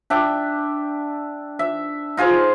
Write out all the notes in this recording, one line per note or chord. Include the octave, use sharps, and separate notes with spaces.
D4 E5 G5
E5
D#4 F4 G#4 C5